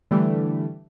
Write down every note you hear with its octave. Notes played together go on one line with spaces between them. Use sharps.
D3 E3 G3 A3